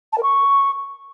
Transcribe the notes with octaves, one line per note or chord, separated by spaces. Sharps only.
A5
A#4
C#6